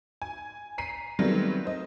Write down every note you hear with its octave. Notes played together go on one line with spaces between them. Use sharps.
G#5
A#5 B6 C7 D#7
D#3 F#3 G3 A3 B3 C4
C5 D#5